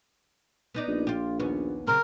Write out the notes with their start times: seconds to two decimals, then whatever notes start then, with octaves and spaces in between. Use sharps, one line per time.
0.75 B3 D#4 D5
0.88 A#1
1.07 F4 G4
1.40 D#2 B3 C#4
1.87 C#3 F#3 C4 A#4